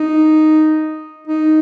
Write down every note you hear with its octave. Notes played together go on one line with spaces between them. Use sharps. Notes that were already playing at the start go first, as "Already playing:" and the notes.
Already playing: D#4
D#4